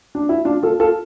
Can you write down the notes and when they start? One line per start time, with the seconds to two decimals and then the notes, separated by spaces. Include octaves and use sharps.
0.15 D4
0.29 E4
0.45 D4 F4
0.63 F4 A4
0.80 F4 A4